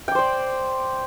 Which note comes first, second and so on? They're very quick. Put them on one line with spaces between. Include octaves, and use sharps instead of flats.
G5 D6 C5 D5